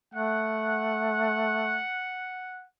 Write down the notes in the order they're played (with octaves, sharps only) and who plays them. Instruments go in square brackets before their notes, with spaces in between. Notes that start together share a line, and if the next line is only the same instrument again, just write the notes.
[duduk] A3 [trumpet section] F#5